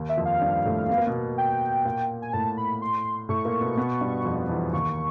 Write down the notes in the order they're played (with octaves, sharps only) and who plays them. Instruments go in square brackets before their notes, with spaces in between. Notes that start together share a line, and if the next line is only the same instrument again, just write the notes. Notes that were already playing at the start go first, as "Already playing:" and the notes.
Already playing: [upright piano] D#2 D#3
[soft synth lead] E5
[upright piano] F2 F3
[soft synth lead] F5
[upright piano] G2 G3
A2 A3
B3
A#3
B2 B3
[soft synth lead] G5
[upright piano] A#2 A#3
[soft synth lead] G#5
[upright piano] A2 A3 [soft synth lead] A5
[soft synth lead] B5
C6
[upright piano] A2 A3 [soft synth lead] C#6
[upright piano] A#2 A#3
B2 B3
B2 B3
G2 G3
F2 F3
E2 E3
[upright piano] D#2 D#3 [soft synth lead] C#6